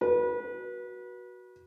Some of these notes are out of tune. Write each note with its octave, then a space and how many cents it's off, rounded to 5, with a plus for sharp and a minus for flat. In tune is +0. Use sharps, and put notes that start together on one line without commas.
F#4 +0 B4 -30